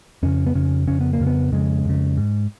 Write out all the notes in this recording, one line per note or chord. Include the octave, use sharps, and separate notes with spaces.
F2 C#3 C#4
B3
F2 C#3 C#4
F2 C#3 C#4
B3
A#3
F2 C#3
B3
F2 C#3 G#3
F2 C#3
G#2